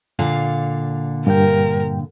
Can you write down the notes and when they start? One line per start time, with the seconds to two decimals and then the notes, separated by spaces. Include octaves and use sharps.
0.19 A#2 D3 F5
1.27 G2 A#4 G5